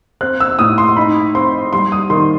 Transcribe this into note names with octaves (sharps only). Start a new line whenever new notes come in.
C4 F#6
E6
A2 D#6
C6
D#4 B5
C4 C6
G3 C6
D#6
D#3 C6